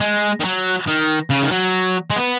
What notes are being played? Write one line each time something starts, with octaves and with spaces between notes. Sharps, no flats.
G#3
D#3
F#3
D#3
C#3
D#3
F#3
G#3
B3